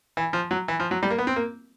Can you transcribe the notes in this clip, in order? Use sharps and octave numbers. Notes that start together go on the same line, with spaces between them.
E3
F3
F#3
E3
F3
F#3
G3
A#3
B3
C4
A#3